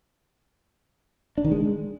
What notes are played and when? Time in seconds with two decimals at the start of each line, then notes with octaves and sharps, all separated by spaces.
1.38 D4
1.44 D#3
1.51 G#3